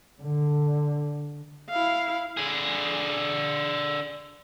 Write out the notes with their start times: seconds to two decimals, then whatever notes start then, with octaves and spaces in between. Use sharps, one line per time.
0.22 D3
1.69 E4 F5
2.37 D3 G#4